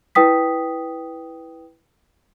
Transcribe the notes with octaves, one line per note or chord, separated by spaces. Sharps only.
E4 B4 G5 D#6 B6